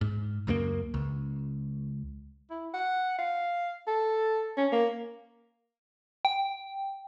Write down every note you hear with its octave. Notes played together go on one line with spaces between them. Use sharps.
G#2
C#2 F#2 G#3 A#3
C#2
E4
F#5
F5
A4
C#4
A#3
G5